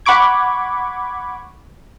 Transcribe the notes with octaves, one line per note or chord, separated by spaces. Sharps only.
F#5 B5 C#6 D6 G#6